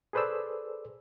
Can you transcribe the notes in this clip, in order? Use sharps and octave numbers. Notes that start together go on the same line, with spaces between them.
G#4 A4 B4 C5 D5 E6